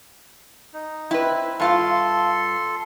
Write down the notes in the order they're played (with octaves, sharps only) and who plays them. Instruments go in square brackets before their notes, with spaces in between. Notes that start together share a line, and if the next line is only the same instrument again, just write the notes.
[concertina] D#4
[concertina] C4 [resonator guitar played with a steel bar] E4 B4
[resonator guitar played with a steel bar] G2 F4 F5 [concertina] A4 C6